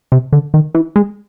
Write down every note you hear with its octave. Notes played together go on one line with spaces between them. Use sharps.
C3
D3
D#3
E3
G#3